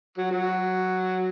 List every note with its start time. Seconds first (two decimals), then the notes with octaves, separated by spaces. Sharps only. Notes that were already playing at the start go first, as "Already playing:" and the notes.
0.18 F#3
0.31 F#3